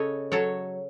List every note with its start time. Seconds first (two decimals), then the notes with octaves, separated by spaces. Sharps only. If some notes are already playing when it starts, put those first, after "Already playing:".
Already playing: C#3 A4 C#5 D#5
0.32 F#3 A4 C#5